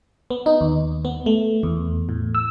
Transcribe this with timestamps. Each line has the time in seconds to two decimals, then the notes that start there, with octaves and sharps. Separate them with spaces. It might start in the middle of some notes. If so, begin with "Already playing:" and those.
0.30 B3
0.46 D#4
0.61 D#2
1.05 B3
1.26 A3
1.63 E2
2.09 A2
2.35 E6